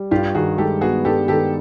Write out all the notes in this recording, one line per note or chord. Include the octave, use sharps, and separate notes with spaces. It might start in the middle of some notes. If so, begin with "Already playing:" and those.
Already playing: G3
G2 F4 G4
D#3 F#4 G#4
G#3 G4 A4
B3 F#4 G#4
G2 G4 A4
D#3 G4 A4